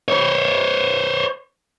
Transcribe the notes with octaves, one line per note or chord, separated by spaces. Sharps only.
C5 C#5